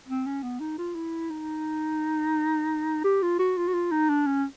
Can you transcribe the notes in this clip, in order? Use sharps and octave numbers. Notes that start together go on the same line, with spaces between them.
C4
C#4
B3
D#4
F4
E4
D#4
G4
F4
F#4
F4
F#4
F4
D#4
D4
C#4